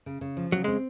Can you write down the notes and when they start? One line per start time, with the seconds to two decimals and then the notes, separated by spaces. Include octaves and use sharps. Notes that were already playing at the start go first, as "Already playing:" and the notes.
0.06 C#3
0.21 C#3
0.37 F3
0.52 C#3 F#3
0.64 G#3 C4